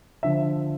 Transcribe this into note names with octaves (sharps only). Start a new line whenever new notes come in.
D3 F3 E5